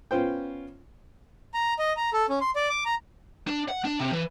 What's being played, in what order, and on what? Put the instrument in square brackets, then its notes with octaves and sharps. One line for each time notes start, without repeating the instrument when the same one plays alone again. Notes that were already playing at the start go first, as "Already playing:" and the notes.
[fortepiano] B3 C#4 F4 C5 G5
[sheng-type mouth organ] A#5
D#5
A#5
A4
C#4
C6
D5
D6
A#5
[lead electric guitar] D4
F#5
D4
C3
E3